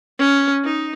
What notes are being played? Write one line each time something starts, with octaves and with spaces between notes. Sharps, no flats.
C#4
D#4